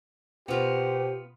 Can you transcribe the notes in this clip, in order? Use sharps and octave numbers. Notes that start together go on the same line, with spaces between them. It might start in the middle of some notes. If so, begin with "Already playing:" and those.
B2 B3 F4 G4 C5